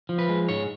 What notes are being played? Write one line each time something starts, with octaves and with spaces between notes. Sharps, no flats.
F3
B4
G#3
G#2 C#5